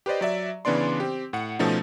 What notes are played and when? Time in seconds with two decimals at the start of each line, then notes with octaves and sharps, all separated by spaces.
0.06 G4 B4 C5 D5 D#5
0.21 F#3 D5 E5
0.65 C#3 E3 B3 D4 D5 C6
1.00 C4 G4
1.33 A2 F#5 C#7
1.59 B2 F3 A3 C#4 D#4